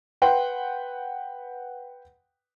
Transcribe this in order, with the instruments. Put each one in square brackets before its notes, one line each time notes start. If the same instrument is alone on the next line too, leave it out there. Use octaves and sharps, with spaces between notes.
[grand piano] B4 F#5 G5 C6